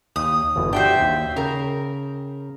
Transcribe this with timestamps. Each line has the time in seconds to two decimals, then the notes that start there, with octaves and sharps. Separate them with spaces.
0.16 D#2 D#6
0.56 G1 E2 B2
0.73 D4 F#4 G4 C5 E5 G5
1.00 D#2
1.37 C#3 A#4